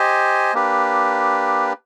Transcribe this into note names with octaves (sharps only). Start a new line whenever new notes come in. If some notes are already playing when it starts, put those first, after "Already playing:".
Already playing: G4 C5 D#5 G#5
A#3 D4 G4 B4